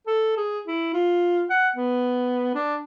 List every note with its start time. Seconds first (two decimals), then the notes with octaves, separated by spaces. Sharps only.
0.07 A4
0.37 G#4
0.67 E4
0.94 F4
1.50 F#5
1.76 B3
2.55 D4